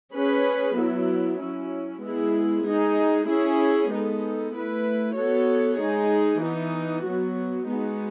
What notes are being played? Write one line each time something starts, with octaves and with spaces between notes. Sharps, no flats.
C#4 G#4 B4
F#3 B3 E4
F#3 C#4 E4
G#3 B3 E4 G#4
G#3 D#4 G#4
C#4 E4 G#4
G#3 B3 D#4 A4
A3 E4 B4
B3 F#4 A4 C#5
G#3 D#4 G#4
E3 B3 D#4
F#3 B3 F#4
G#3 B3 D#4 F#4